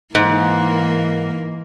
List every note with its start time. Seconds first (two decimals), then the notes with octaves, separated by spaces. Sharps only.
0.15 G#2 E3 A#3 A#4